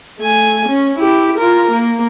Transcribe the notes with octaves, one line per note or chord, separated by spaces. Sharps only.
A3 G#5
C#4
E4 G4
F4 A#4
A#3